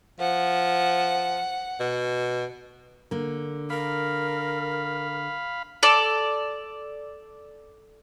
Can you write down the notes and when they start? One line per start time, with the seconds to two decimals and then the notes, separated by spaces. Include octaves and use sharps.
0.20 F3 F#5
1.80 B2
3.11 D3 A#3
3.70 A#4 F5 B5
5.83 A4 D5